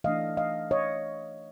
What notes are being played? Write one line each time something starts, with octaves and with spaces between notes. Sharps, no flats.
E3 A3 D4 D#5 F5
D#5 F5
C#5 D#5